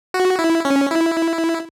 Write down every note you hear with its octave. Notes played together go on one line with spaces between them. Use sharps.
F#4
E4
C#4
E4